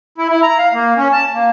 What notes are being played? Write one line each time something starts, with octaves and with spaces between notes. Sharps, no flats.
E4
E4
A#5
F5
A#3
C#4
A5
A#3